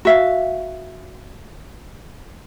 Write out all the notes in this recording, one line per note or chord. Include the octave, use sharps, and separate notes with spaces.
F#4 E5 F5